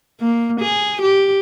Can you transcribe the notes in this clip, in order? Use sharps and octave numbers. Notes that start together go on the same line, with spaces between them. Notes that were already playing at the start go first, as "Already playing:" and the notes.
A#3
G#4
G4